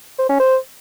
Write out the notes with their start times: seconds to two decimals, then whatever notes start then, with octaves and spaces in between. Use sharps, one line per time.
0.19 C5
0.29 C#4
0.40 C5